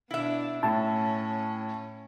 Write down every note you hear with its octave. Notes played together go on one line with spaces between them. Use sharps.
B2 D4 E4 E5
A2 C#4 A5